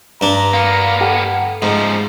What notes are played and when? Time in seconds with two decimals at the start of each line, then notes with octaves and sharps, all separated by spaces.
0.21 G2 D4 A#5
0.54 A#3 B3 F5
1.01 G4 A4 F#5
1.62 G#2 C#3 F3 D#4 A#5